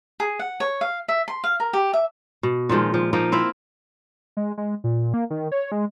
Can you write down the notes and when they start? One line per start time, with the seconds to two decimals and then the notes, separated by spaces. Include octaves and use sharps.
0.20 G#4
0.39 F#5
0.60 C#5
0.81 F5
1.08 E5
1.28 C6
1.44 F5
1.60 A#4
1.73 G4
1.93 E5
2.43 B2
2.69 A#2 D#3 F3 G#3
2.94 F3
3.13 F3 A#3 D#4
3.32 C4 E4 E5 F5
4.37 G#3
4.58 G#3
4.84 A#2
5.14 A#3
5.30 D#3
5.52 C#5
5.72 G#3